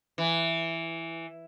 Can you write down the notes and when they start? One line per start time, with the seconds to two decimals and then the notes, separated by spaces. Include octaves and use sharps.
0.18 E3